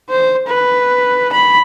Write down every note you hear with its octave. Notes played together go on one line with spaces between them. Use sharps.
C5
B4
B5